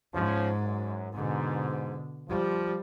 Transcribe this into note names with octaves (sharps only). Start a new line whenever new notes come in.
G#2 F3 C#4
F#2
G#2 B2 D3
F3 G3